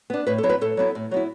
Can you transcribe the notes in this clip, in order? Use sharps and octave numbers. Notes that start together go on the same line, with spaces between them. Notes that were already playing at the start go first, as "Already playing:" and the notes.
B3 D4
A2 B4
A4
F#3 B3 E4
B4
A2 A4
F#3 B3 E4
A2
F#3 B3 E4